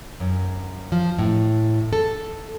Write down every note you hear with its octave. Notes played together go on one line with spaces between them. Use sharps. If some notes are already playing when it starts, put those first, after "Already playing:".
F#2
F3
A2
A4